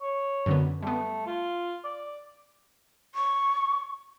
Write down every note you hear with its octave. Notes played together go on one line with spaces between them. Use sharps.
C#5
F#2 D3 B3
G3 A3 B3
F4
D5
C#6